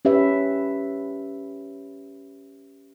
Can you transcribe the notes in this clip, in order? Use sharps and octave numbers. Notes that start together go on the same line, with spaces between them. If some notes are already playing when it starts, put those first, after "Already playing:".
C#4 G4 B4 E5